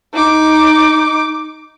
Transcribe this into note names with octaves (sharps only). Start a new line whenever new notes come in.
D#4 D6